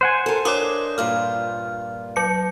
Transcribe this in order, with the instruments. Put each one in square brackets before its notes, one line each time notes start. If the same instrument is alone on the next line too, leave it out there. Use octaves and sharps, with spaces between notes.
[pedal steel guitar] C5 F#5 G#5
[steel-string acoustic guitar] A4 A#4
[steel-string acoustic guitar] D4 A#4 E5 [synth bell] C#5 D6 D#6
[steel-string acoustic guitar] G2 A#2 F4 [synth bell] F6
[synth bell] F#3 C#7